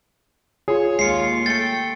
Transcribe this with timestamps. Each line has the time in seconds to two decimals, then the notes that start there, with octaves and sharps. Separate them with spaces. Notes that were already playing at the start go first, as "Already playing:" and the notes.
0.68 F4 G#4 C#5
0.99 D#2 G#3 F4 C7 C#7
1.46 A3 G5 A6 C#7